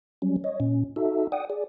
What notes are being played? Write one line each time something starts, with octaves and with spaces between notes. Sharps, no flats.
F#3 G3 C#4
C#5 D#5
A#2 C#4
D#4 F#4 A4 E5
D5 F#5 G5 D#6
G#4 D5